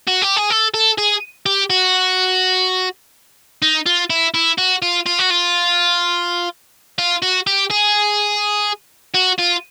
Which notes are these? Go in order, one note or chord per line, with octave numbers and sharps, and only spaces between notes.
F#4
G4
G#4
A4
A4
G#4
G4
F#4
D#4
F4
E4
E4
F#4
F4
F4
F#4
F4
F4
F#4
G4
G#4
F#4
F4